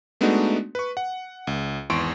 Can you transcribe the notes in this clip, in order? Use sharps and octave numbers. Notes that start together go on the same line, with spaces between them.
G#3 A3 B3 D4 D#4 F#4
B4 C#6
F#5
C#2
G#1 E2 C6 C#6 D7